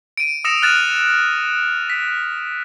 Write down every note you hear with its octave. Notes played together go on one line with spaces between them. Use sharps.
D7 D#7
D#6 E6 A#6 C#7 E7 F7
F6 F#6 A6 E7
B6